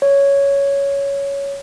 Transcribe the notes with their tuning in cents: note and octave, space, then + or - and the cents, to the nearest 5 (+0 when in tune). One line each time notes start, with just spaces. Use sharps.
C#5 +10